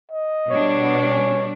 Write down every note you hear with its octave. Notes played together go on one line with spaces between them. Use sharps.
D#5
B2 G3 D4 C#5
B3
C#4